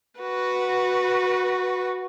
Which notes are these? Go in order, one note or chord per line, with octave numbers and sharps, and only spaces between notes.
F#4 B4